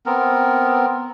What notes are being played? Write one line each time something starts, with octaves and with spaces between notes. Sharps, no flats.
B3 C4 A#4